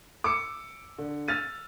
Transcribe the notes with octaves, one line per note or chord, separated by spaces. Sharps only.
D6 E6 C#7
D3
E6 F6 A6 D#7